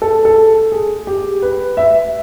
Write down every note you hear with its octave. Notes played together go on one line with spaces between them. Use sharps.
A4
A4
G#4
G4
B4
E5